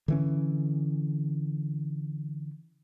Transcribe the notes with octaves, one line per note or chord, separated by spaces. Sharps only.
D3 E3 C#4